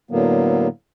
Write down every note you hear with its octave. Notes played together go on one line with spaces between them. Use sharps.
A2 D3 F#3 A#3 B3